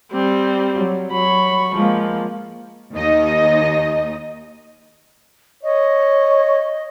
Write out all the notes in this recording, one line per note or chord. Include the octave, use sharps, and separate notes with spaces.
G3 C4
F#3
F#3 B5 C#6
F3 G#3 A#3
D#2 D#4 D#5
C#5 D#5